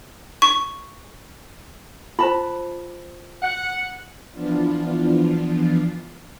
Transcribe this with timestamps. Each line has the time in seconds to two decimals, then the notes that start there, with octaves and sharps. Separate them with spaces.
0.42 C#6
2.19 F4 C5 A5 B5
3.42 F#5
4.32 E3 F3 B3 D4 F4